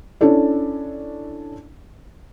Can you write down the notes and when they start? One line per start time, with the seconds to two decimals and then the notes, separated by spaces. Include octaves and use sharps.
0.21 C#4 D4 E4 A4 D5